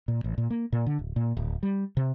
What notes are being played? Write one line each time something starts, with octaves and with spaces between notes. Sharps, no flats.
A#2
A1
A#2
A#3
A#2
D3
D1
A#2
D1
G3
C3